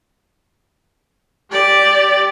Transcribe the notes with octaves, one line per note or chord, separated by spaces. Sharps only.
G4 D5